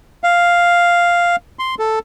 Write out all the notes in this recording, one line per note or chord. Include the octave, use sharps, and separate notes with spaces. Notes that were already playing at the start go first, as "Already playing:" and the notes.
F5
C6
A4